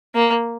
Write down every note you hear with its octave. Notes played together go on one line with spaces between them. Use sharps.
A#3